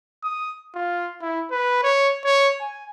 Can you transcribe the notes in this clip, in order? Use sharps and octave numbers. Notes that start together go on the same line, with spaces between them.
D#6
F4
E4
B4
C#5
C#5
G#5